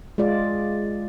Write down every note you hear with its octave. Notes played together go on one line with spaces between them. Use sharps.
G#3 F4 D5